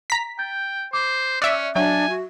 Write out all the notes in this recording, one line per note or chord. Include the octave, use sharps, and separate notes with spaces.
A#5 B6
G5 G6 A6
C5 D6
C#4 D5 E5 F#6
F#3 D4 E5 G#5 D#7
F#4